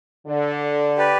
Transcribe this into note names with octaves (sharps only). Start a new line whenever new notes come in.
D3
G4 B4 D5